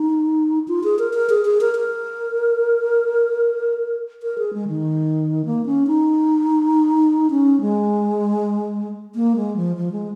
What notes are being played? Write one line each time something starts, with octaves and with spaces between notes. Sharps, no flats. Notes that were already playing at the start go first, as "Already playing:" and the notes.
Already playing: D#4
F4
G#4
A#4
A#4
G#4
G#4
A#4
A#4
A#4
G#4
G#3
D#3
A#3
C#4
D#4
C#4
G#3
A#3
G#3
F3
F3
G#3